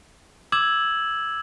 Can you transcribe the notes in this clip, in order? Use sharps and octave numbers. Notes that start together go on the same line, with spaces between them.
D6 E6 G#6 E7 F#7